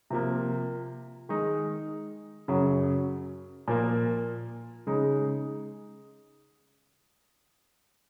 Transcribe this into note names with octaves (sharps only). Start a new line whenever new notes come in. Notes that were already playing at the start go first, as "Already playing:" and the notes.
C3 F3 A#3
D#3 G#3 D#4
F#2 C#3 F#3
A#2 F3 A#3
C#3 G#3 D#4